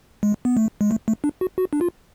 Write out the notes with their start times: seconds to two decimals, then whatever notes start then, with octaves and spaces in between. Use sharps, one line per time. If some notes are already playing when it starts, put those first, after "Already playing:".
0.23 G#3
0.45 B3
0.57 A3
0.81 G#3
0.91 A3
1.08 A3
1.24 D4
1.41 F#4
1.58 F#4
1.73 D4
1.81 F4